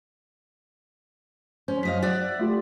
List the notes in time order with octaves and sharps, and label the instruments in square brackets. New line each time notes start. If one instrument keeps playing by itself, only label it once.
[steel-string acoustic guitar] C#4 [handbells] C5
[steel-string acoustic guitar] F#2 D#5 F5 [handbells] B6
[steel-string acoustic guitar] D5 E5 F#5
[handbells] A3 F4 G4